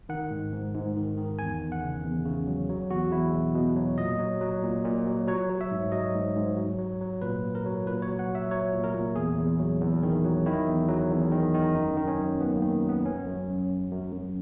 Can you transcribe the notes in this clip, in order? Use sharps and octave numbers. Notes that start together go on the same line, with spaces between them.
D#3 F#5
G#2
G#2
G#2
D#3
D#3
E2 G#5
E2
F#5
C#3
E2
C#3
F#3
F#3
E2 F#4
E2 E4
B2
B2
F#3
A#2 D#5
F#3
F#3
A#2
A#2
F#3
F#3 C#5
F#3
E5
G#2
F#3 D#5
G#2
G#2
F#3
F#3
F#3
A#2 B4
A#2
A#4
F#3
A#2 B4
C#5
F#3
F#5
F#3
E5
F#3 C#5
A#2
A#4
A#2
E2 G#4
E2
F#3
E2
D#3
F#3
D#3 E4
E2
F#3
E2
D#3
D#3
F#2 D#4
D#3
C#4
F#2
F#3 B3
A#3
D#3
F#3 B3
F#2 C#4
F#2
F#3
F#2
F#2
F#2